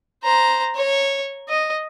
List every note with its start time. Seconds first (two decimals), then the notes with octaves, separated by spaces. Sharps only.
0.24 C5 A#5
0.75 C#5
1.49 D#5